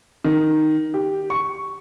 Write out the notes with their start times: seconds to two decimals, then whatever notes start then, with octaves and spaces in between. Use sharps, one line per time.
0.24 D#3
0.94 G4
1.30 C#6